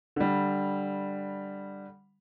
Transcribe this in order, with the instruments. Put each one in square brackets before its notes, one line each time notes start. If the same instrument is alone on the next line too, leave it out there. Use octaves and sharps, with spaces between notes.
[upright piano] D3 G3